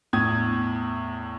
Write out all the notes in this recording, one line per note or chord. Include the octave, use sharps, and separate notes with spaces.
E2 A2 D#6 G#6